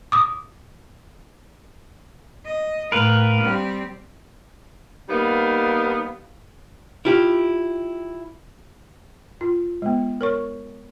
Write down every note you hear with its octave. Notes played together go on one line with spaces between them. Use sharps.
D6 D#6
D#5
A2 A#4 B4 F5
G3 C4
G3 A#3 B3 D#4 F5
E4 F4 G4
F4
G#3 B3
A#4 C#5 C#6